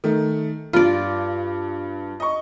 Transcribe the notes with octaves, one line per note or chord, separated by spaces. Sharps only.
D#3 A3
G2 F4 D5
D#5 C#6